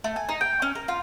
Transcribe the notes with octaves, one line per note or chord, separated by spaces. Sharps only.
A3
G#5
D#4
G5
C#4
A#4
F4